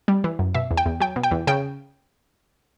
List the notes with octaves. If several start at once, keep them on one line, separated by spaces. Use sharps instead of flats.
G3
E3
F#2
B2 E5
E2
G5
E2
F#3 G5
B2
G5
E2
C#3 G5